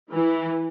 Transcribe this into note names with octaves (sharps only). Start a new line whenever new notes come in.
E3